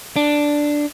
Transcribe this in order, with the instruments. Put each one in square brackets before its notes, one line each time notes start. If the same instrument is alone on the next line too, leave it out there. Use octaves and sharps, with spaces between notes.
[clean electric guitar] D4